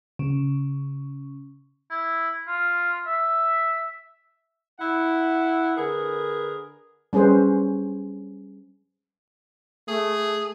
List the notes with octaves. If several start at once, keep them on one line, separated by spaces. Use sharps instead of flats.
C#3
E4
F4
E5
E4 F#5
D3 G#4 A#4 B4
G3 C#4 G#4 B4 C5
A3 G#4